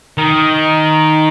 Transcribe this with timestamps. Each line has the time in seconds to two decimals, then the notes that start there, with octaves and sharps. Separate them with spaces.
0.18 D#3